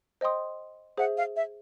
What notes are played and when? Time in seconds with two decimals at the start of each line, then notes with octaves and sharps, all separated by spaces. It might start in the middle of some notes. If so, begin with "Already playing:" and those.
0.21 C5 D#5 G5 C6 D#6
0.97 G#4 C5 E5 F#5
1.17 F5
1.36 E5